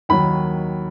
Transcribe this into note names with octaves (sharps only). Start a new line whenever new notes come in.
D#2 D#3 F#3 B5